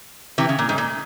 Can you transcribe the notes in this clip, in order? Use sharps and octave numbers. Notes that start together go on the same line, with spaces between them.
C3 E3
C#3
A#2
G#2
A#2